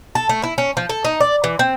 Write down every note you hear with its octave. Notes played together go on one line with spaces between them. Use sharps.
A4
A3
E4
C#4
F3
A4
D#4
D5
E3
C4